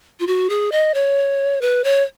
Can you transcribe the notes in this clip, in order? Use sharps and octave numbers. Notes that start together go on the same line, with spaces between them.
F4
F#4
G#4
D#5
C#5
B4
C#5